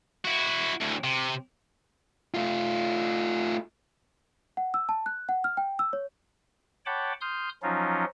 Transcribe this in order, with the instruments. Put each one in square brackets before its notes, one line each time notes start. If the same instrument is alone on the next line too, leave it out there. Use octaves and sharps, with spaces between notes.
[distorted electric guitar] E4 F#4
D2 A2
C3
[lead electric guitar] A3 F4
[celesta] F#5
E6
A5
F#6
F#5
F6
G5
E6
C#5
[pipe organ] C#5 F#5 G5 A5 B5 D6
C6 D#6 F6 G6
F3 F#3 C#4 D#4 F4